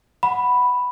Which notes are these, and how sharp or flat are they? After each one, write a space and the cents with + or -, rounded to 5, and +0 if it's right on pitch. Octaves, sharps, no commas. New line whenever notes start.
F#5 +0 B5 +0